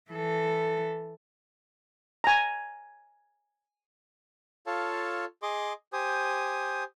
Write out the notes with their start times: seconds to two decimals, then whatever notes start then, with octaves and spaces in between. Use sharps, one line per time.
0.11 E3 A4
2.24 G#5 A#5
4.67 F4 A4 C#5 F5 A5
5.42 G#4 D#5 C6 D6
5.93 G4 C5 G#5 D#6